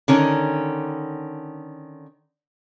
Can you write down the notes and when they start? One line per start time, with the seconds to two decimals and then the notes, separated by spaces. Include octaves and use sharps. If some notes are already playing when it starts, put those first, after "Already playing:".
0.08 D3 D#3 C#4